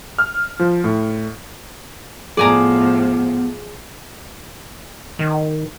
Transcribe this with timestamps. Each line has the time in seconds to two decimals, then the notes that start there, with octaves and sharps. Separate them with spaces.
0.18 F6
0.59 F3
0.84 A2
2.37 A2 C3 F3 B3 G#4 D5 G#5 A#5
5.19 D#3